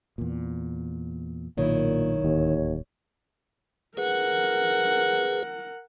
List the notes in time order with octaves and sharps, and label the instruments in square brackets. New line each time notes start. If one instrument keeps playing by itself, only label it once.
[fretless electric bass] E2 A#2
[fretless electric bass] B1 [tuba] A#2 [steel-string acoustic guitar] D#3 E4 [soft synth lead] C#5
[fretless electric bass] D1 [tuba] D#2
[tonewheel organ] G#4 B4 [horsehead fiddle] A#4 F#5